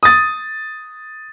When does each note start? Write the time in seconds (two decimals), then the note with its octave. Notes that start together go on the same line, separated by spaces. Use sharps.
0.03 D#6 A6